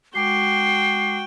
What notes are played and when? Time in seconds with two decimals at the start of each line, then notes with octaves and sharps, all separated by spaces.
0.15 G#3 F#4 G5 D6 C7